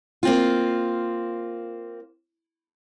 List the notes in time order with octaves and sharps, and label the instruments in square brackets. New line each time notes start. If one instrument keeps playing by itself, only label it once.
[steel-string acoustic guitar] A#3 C4 F4